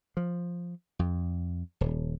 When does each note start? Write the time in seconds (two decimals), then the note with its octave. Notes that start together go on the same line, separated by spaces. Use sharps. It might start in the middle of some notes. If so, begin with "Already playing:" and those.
0.17 F3
0.99 F2
1.81 D#1